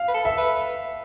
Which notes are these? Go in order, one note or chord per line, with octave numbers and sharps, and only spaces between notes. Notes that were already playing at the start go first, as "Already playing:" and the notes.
Already playing: F5
B4
A4
E5
B4